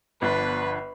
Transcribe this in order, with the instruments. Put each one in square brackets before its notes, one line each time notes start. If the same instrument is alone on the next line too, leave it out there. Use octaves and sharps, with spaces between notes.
[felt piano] G1 [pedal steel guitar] F3 B3 D4 [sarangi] B4